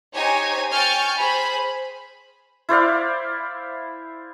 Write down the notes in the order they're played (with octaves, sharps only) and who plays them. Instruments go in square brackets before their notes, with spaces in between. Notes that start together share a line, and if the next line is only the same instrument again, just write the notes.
[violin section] D#4 G4 C5 C#5 G#5
G5 G#5 C#6 F6 G6 A6
G#4 C5 B5
[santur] E4 C5 D5 F5